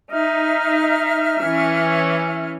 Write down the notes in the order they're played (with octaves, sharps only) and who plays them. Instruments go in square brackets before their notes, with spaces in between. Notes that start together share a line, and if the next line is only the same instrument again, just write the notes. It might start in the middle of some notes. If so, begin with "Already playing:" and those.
[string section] D#4 [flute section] E5 F6
[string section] E3 C#4